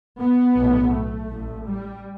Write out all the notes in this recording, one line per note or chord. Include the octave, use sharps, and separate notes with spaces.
B3
B1 A2
A3
A1 A2
G3